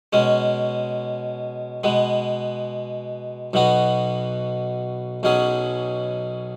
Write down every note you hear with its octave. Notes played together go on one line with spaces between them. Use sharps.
B2 G#3 C#4
B2 G#3 B3
B1 B2 B3 F#4
B1 B2 F#3 C#4 G#4